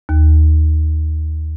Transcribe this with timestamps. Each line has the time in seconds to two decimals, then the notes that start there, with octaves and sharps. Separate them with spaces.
0.09 D#2